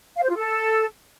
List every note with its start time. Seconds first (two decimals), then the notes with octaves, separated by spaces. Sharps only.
0.17 F5
0.23 C5
0.29 F4
0.36 A4